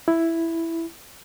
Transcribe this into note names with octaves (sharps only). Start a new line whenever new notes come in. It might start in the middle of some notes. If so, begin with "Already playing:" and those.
E4